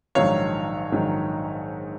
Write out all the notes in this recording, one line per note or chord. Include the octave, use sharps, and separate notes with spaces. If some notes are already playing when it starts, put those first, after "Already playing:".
A#1 G#2 D#3 F#3 C#5 F5
A#1 G#2 D#3 F#3